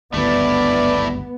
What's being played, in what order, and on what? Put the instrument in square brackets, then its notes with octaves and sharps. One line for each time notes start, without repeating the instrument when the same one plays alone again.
[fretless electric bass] G#1 D2 G2 [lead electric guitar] A3 E4 [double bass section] B3 [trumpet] D5